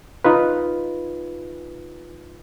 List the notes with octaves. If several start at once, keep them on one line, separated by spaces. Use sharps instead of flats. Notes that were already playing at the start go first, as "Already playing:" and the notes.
D#4 F4 B4